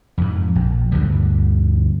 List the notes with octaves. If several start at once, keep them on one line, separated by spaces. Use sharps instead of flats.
F2 G#2
A#1
D2 G2 D3 G3